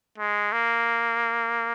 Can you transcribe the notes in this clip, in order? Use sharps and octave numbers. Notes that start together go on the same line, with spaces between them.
G#3
A#3